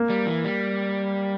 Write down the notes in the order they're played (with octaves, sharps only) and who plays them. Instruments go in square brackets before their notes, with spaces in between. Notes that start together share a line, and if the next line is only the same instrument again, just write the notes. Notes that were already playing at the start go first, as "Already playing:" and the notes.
Already playing: [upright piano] A#3
[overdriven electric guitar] G3
E3
G3